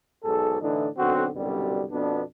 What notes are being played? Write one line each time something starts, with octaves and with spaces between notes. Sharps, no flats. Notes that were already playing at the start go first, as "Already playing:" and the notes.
B1 G#2 G#4 A4
A2 D3 E3 D4 D#4
B1 D3 C4 F#4
C2 F#2 B2 D3 G3
F2 B2 B3 D4